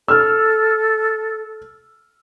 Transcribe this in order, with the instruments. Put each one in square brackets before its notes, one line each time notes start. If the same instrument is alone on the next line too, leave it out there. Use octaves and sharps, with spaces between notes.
[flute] A4 [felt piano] E6 F6